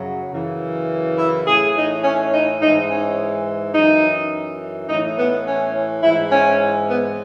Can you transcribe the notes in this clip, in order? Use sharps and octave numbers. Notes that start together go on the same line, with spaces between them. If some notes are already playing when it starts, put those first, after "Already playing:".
Already playing: F#2 C#3 F#3
F#2 C#3 E3
E4
A2 E3 G#4
D#4
C#4
D#4
G#2 E3 D#4
C#4
F#2 E3 D#4
A2 E3 D#4
B3
C#4
G#2 E3 E4
C#4
B3